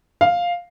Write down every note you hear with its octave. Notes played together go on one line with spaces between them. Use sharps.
F5